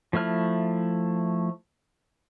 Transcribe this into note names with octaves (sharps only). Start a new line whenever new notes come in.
F3 A3 E4 F6